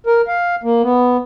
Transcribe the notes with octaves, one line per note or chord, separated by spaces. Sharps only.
A#4
F5
A#3
B3